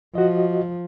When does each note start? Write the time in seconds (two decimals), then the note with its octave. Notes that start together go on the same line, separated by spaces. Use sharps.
0.15 F3 F#4 D#5